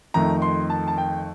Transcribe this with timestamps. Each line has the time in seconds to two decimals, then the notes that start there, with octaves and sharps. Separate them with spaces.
0.14 F2 D#3 A3 A#5
0.42 C6
0.70 A5
0.88 A5
0.98 G5